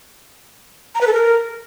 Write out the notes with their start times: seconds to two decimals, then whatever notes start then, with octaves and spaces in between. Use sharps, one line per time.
0.95 A#5
1.01 B4
1.07 A4
1.13 A#4